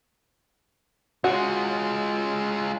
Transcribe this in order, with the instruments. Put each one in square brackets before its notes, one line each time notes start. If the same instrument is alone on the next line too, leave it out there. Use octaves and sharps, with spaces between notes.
[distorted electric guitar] G#3 F4 [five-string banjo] F#4